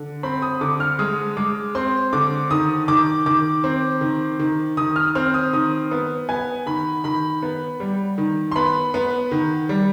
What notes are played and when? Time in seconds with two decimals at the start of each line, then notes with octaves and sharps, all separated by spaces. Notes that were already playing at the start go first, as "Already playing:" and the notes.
Already playing: D3
0.23 C4 B5
0.42 D#6
0.61 D3 D6
0.80 F6
0.99 G#3 D#6
1.37 G#3 D6
1.75 C4 C6
2.13 D3 D6
2.50 D#3 D#6
2.88 D#3 D6
3.26 D#3 D6
3.64 C4
4.01 D#3
4.39 D#3
4.77 D#3 D#6
4.96 F6
5.15 C4 F6
5.34 D#6
5.53 D#3 D#6
5.91 B3
6.29 B3 G#5
6.66 D#3 B5
7.04 D#3 B5
7.42 B3
7.80 G3
8.18 D#3
8.52 C6
8.56 B3 B5
8.94 B3
9.31 D#3
9.69 G3